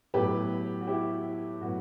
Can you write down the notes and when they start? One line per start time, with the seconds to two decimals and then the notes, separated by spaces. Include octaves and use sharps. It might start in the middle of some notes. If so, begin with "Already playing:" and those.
0.14 A2 F#3 B3 G4 B4
0.81 F#4
0.87 E4 G4
1.61 A2 F#3 B3 F#4